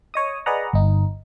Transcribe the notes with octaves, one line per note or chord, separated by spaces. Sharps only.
C#5 D#5 D#6
G#4 B4 D5 D#5 F#5 A#5
G1 D#4